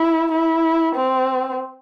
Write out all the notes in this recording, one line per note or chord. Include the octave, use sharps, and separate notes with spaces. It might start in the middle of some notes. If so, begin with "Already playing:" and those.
Already playing: E4
E4
C4